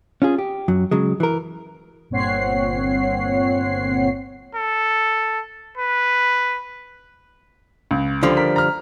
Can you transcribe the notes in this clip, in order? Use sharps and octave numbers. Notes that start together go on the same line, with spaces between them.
C#4 F4 G#4
G4
F#2 F#3
C#3 F#3 G#3
E3 A#4
G1 A#2 C4 C#5 F#5 C7
A4
B4
C#2
D3 F3 G3
A#4 B6
A#5 F6